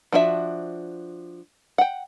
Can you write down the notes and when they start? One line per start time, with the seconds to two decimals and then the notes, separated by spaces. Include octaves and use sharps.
0.13 F3 D4 F#4 A4 E5
1.78 F#5 G5